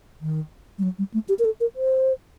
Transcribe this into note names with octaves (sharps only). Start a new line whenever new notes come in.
D#3
G3
F#3
G3
A3
G4
A#4
A4
A#4
C5